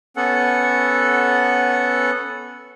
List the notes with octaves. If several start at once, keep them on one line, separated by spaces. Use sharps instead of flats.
B3 C#4 A4 F#5